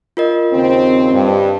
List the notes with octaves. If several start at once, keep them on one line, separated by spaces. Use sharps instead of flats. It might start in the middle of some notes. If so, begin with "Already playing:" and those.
F4 A#4 D#5
D#2 C#3 C4
G2